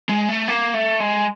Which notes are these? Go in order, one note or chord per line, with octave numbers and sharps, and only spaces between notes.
G#3
A3
A#3
A3
G#3